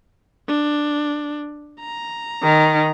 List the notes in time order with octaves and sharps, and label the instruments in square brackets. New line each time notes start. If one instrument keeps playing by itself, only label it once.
[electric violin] D4
A#5
[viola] D#3